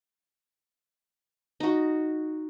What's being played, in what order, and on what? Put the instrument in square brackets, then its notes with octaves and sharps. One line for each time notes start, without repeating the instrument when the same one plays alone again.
[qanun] D#4 F#4